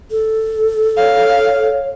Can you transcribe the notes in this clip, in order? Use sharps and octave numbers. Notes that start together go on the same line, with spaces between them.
A4
C#5 F5